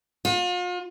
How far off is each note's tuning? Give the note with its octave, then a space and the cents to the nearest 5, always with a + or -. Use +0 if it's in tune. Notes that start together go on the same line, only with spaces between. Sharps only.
F4 +40